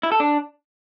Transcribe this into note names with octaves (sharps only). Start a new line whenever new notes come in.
E4
A4
D4